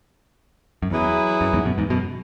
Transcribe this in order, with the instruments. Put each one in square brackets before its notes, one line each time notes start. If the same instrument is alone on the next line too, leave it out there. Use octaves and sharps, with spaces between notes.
[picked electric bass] F#2
[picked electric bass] E2 [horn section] F#3 E4 G#4 B4
[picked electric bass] F#2
E2 G#2
F#2 B2
E2 G#2
F#2 B2